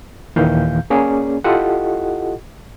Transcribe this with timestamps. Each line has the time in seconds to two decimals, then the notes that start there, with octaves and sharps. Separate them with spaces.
0.36 D#2 A#2 D#3 E3 F5 G6
0.90 A#3 C#4 G#4 D5
1.44 E4 F4 G4 A4 D#5 F#5